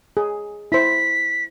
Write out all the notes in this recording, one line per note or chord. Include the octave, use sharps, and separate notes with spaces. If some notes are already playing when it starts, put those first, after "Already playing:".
G#4
E4 C5 B6